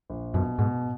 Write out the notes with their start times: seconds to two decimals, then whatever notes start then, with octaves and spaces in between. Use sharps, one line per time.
0.09 A#1
0.34 F#2 B2
0.59 G#2 B2